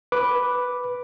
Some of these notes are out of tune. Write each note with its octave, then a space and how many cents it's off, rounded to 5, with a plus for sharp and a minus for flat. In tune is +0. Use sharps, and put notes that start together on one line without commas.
B4 +0 D6 +0